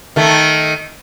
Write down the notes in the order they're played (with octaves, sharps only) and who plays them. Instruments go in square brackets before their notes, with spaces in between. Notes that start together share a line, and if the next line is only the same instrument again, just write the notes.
[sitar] D#3 A3